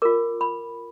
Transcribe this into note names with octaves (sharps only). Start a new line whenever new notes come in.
F4 A#4 D6
B5